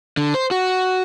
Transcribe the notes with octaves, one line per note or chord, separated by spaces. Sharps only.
D3
C5
F#4